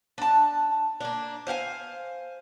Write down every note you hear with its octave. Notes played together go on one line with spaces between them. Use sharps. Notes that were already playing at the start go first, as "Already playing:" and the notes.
D4 A5
A#3 D4
C5 F5 F#5 G#5